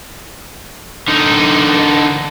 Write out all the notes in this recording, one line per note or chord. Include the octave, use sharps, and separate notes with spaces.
D3 D#4